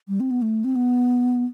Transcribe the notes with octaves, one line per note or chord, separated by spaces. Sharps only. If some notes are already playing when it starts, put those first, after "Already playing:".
G3
C4
B3
A3
C4
B3